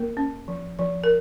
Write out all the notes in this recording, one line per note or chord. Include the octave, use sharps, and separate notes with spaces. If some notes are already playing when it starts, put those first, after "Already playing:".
Already playing: A#3 A#4
C#4
F3
F3
A#4